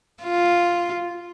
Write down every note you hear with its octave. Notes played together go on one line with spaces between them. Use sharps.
F4